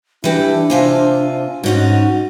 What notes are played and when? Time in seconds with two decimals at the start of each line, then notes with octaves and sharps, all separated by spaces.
0.24 E3 D4 E4 G4
0.70 C3 F4 C5 G#5
1.63 G#2 C#4 D#4 F#4